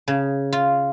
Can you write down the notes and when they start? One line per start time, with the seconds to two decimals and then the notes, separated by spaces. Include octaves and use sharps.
0.08 C#3
0.53 F4